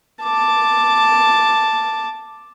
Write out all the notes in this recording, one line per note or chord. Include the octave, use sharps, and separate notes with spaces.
A5 D6